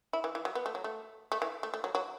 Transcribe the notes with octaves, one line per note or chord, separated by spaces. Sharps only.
E4
E3
E3
F#3
B3
A3
F#3
A3
A3
E3
A3
A3
F#3
F#3